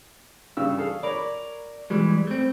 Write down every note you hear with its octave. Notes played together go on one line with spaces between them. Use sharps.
G2 C#3 E6
G#4 A4 F5
A#4 C#5 D5 B5
B2 E3 G3 G#3
A3 C4